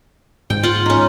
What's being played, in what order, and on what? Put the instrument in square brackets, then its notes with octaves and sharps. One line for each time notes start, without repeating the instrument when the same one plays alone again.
[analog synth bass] G#2 [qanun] G5
[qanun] F4 F#5
C#4 D#4